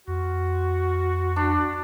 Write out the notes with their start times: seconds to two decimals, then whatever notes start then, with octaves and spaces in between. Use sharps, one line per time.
0.08 F2 F#4
1.36 D4